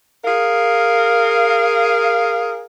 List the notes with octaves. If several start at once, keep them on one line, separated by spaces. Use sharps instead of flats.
G#4 A#4 F5